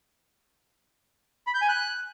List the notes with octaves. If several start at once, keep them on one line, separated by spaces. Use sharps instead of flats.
B5
G6
G#5
F#6